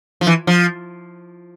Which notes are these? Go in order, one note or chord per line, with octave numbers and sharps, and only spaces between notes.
F3
E3
F3